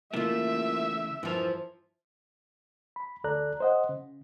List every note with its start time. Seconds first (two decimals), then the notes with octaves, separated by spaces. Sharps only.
0.14 C#3 E3 A3 A#3 F4 E5
1.23 E2 G2 E3 F3 A#4
2.96 B5
3.24 D2 A4 D5 A#5 F#6
3.60 C5 D#5 F#5
3.89 C#3